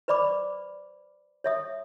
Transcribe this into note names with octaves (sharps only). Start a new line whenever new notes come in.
B4 C5 D5 B5 D6
C#5 E5 D#6